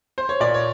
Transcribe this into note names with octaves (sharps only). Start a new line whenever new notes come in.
C5
C#5
A#2 D5
C#5